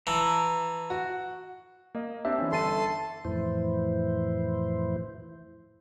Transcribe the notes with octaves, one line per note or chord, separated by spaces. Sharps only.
E3 A5 A#5
F#4
A#3 D#5
C4 D4 G4 E5
E3 C#4
G1 A4 C6 D#7
F2 A2 E3 E4 C5